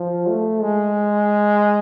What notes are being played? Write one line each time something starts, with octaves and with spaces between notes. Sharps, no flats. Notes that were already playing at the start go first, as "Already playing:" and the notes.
Already playing: F3
A3
G#3